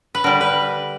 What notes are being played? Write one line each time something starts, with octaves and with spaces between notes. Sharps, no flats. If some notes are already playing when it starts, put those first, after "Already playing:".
B4
D3 G3 A#4
B4